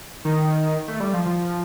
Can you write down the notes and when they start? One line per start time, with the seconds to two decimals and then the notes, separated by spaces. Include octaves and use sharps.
0.25 D#3
0.88 A3
1.00 G3
1.14 F3
1.25 F3